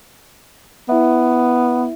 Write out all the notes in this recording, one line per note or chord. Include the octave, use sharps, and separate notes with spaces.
B3 E4 E5